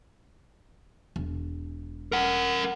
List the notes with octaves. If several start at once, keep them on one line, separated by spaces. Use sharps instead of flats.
E1
A#4 F#5